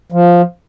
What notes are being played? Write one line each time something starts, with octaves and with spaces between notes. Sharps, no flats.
F3